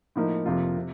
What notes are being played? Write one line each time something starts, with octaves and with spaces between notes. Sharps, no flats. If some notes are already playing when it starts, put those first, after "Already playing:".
A2 F3 A#3 D#4
F2 C3 F3 A#3 F4
C3